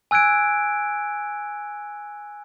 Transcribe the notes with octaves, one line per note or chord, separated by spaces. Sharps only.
G#5 E6 F#6 G#6 D7